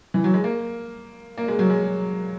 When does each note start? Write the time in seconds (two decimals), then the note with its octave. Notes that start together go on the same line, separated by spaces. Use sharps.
0.14 E3
0.24 F#3
0.34 G#3
0.44 A#3
1.38 A#3
1.48 G#3
1.59 F#3
1.70 G#3